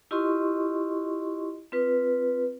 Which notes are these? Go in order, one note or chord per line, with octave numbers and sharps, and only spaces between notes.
E4 F4 G4 D#5 C6 C#6
C4 F4 B4